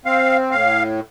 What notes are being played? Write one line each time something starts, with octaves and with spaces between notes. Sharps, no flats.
C4 F5
A2 F5